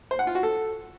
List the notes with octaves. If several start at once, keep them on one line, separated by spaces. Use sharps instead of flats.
C5
F#5
F4
F#4
A4